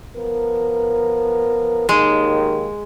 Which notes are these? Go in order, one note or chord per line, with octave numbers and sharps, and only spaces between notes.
F3 B3 A#4
D#2 D#3 G#3